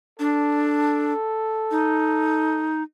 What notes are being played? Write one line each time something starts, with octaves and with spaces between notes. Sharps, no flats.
D4 A4
D#4